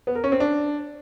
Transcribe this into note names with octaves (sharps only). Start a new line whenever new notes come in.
B3
A#4
C#4
C4
D4